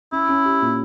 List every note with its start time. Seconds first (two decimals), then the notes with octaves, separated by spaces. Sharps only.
0.12 C#4 E4
0.29 C#4
0.45 G4
0.62 A#2